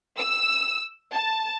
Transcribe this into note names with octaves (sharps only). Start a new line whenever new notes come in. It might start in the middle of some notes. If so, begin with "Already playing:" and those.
E6
A5